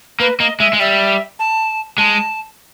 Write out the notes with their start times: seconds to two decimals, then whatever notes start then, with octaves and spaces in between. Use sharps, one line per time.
0.20 A#3 B4
0.40 A#3 D#5
0.59 G#3 E5
0.73 G#3
0.80 G3 E5
1.39 A5
1.98 G#3 A5